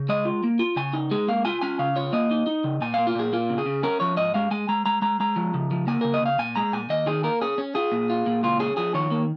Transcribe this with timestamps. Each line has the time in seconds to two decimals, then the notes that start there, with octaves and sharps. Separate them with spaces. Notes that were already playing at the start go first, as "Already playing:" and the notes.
Already playing: C#3
0.09 G#3 D#5
0.25 F4
0.43 A#3
0.59 F4
0.76 C#3 G#5
0.93 D#4
1.11 G#3 G#4
1.28 A#3 F5
1.45 F4 G#5
1.61 C#4 G#5
1.79 C#3 F5
1.96 F4 C#5
2.13 A#3 D#5
2.31 D#4
2.47 D#4
2.64 C#3
2.81 A#2 G#5
2.94 A#3 F5
3.07 F4
3.15 A#2 G#4
3.33 A#3 F4
3.50 C#3
3.58 G#4
3.66 C#3
3.83 C#4 A#4
4.00 F3 C#5
4.17 G#2 D#5
4.34 G#3 F5
4.51 G#3 G#5
4.69 G#3 A#5
4.86 G#3 A#5
5.02 G#3 A#5
5.20 G#3 A#5
5.36 F3
5.54 C#3
5.71 F3
5.87 A#3 G#5
6.01 C#3 A#4
6.14 D#5
6.22 C#3 F5
6.39 A#2 G#5
6.56 G#3 A#5
6.73 A#2 G#5
6.89 D#2 D#5
7.06 D#3 G#4
7.23 A#3 A#4
7.41 C#4 G#4
7.58 C#4
7.75 F4 G#4
7.92 A#2
8.10 F4
8.26 A#2
8.43 C#2 F4
8.59 C#4 G#4
8.77 F3 G#4
8.94 D#3 C#5
9.11 A#3